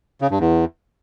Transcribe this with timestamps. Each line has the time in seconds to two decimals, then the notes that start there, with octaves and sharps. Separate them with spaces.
0.21 C#3
0.31 G2
0.40 E2